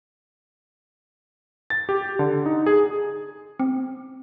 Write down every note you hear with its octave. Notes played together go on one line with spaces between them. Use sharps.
A6
G4
D3
D#4
G#4
C4